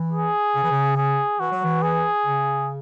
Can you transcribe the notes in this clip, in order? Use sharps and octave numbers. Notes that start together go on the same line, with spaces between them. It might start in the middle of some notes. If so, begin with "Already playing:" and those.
Already playing: E3
G#4
C#3
E3
C#3
G#4
E3 F#4
F#3
E3
G#4
C#3